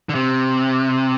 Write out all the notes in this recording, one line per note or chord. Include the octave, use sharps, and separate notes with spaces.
D3
C3